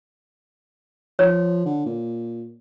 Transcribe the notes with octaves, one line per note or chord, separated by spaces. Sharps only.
F3 C#5
D3
A#2